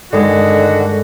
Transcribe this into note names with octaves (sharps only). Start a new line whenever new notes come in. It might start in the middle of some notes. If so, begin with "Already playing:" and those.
G2 D3 D#3 G#3 F#4